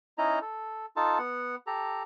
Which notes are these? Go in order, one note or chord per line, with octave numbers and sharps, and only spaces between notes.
C#4 D#4 E4 D#5 A#5
A4
D#4 F4 A4 A5
B3 F#5
G4 A4 A#5